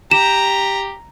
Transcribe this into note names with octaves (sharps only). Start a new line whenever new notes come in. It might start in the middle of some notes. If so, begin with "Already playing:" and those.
G4 A#5 E7